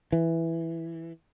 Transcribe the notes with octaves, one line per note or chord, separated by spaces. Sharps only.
E3